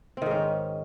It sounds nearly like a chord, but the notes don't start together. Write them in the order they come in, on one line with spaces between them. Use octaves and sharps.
C4 D#3 G#2 C#4